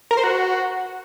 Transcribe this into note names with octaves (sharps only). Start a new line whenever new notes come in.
A#4
C5
F#4